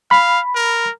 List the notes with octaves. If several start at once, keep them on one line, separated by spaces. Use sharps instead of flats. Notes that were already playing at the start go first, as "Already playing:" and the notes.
F5 B5
A#4